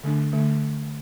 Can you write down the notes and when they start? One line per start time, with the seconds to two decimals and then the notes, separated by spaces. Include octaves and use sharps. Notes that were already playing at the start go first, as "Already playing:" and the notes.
0.03 D3 A3 D4
0.32 D3 A3 D4